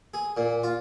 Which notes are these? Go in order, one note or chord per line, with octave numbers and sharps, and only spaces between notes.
G#4
A#2
F4